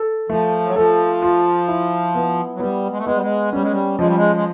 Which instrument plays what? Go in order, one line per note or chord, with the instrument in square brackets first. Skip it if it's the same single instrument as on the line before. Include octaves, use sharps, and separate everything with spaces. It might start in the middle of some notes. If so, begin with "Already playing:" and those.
Already playing: [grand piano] A4
[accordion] F3 [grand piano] A3
[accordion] F#3
[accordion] F3 [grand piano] A4
[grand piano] F4
E4
B3
[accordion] F#3
[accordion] G3 [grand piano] B3
[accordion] G#3
A3
[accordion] G#3 [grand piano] B3
[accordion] G3
G#3
[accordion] G3 [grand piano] C#4
[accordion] G#3
G3
[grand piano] F3 [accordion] G#3
[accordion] G3
G#3
G#3